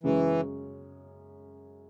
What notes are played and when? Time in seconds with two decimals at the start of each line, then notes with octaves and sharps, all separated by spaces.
0.04 F#2 C#3 E3 G#3 C#4